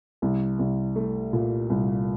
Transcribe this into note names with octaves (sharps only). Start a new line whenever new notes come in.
C2
C2
A3
A#2
C2